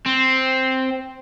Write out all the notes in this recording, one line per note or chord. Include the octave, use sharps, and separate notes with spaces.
C4